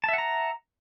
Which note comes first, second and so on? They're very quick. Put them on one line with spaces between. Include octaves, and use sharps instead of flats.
A5 E5 F#5 A#5